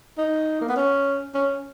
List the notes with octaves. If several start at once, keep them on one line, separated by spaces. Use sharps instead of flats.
D#4
A#3
B3
C#4
C#4